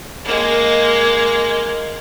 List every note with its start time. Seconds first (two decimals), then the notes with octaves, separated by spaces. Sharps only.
0.24 G#3 A#3